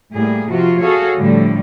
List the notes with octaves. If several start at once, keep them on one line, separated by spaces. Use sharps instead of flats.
A2 G3 A#3 G#4
C3 F3 F4 F#4
F#4 G#4 A4 C#5 F5
A2 D3 F3 G3 A3